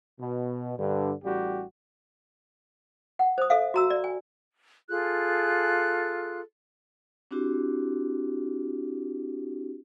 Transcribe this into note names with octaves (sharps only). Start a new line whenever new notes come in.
B2
G2 D3
A1 G3 F#4 G4
F#5
C5 D#6
A4 E5 F5
F#4 A#5 E6
D5
G#5
F4 G#4 A4 F#6
C4 D4 E4 F#4 G4